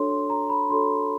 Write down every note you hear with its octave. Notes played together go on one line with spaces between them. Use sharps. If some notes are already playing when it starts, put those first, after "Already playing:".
Already playing: D4 F#4 A4 C#5 C6
C6
A#5
B5
D4 F#4 A4 C#5 C6